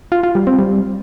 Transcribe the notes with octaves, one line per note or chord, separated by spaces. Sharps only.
F4
F4
G3
C4
G3